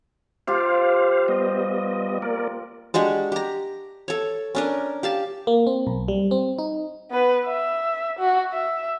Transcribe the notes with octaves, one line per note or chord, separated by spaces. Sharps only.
F3 F4 G4 C5 F5
G3 B3 D#5
A#3 A#4 D5
G#3 D4 F#4 G4
G4 A#5
A4 C#5
C#4 D4 A#4
G4 F5 A5
A#3
C4
B1
G3
C4
D#4
B3 B4
E5
F#4
E5